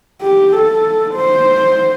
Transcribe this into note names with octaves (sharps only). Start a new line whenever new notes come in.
G4
A4
C5